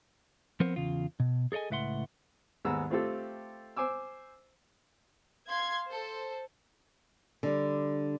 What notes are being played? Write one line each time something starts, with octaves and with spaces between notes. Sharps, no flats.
F3 B3 C4 A#4 C5
E2 C#3 F4
B2
G#4 A4 C#5 D#5 G#5
C#2 A2 B4 E5 F#5 C6
D#2 G#2 B3 G#4 A#5 E6
A3 C4 F4 G4 A4
C5 G#5 D6 E6
F5 C6 G#6
A4 C5
D3 G3